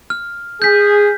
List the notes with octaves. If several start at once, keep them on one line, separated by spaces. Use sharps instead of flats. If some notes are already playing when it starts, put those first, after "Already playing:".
F6
G#4 G6 B6